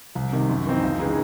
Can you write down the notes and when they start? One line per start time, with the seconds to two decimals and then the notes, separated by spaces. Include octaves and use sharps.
0.15 C2
0.32 C3 D#3
0.49 F#2
0.67 E3 C4 D#4
0.83 C#2
0.99 C#3 E3 G#3 D#4